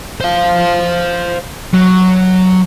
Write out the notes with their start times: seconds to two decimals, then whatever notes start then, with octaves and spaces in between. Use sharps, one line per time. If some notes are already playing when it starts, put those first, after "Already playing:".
0.20 C5 F5
1.74 F#3